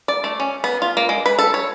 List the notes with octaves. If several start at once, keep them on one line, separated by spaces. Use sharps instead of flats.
D5
A3
C#4
B3
F4
A#3
G#3
B4
A4
C#5